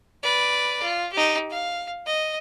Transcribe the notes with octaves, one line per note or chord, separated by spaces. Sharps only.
B4 D5
F4
D#4 G4
F5
D#5